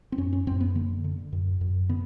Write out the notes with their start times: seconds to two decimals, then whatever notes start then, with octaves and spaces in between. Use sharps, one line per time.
0.12 C4
0.18 F#2 C#4
0.33 C#4
0.47 F#2 C4
0.61 B3
0.75 D3 A#3
1.04 D3
1.33 F#2
1.61 F#2
1.89 D3 B3